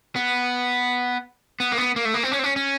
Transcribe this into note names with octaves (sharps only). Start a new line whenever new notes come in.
B3
B3
A#3
B3
A#3
A3
A#3
C4
C#4
C4
C#4
C#4